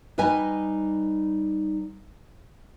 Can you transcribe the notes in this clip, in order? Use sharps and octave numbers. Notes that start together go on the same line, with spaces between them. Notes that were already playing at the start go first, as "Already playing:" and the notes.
G3 D#4 B4 D#5 G#5